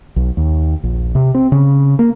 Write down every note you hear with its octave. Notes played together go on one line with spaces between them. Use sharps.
B1
D#2
A#1
C3
C4
C#3
A#3